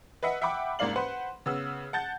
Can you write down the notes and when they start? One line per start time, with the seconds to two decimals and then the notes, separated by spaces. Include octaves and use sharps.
0.23 B4 D#5 E5 F#5
0.42 E5 F#5 G5 B5 D6
0.79 C2 G#2 A#3 D5 F5 F#7
0.96 B4 C5 F#5 C6
1.46 C#3 B3 E6
1.93 F#5 A5 G6 A6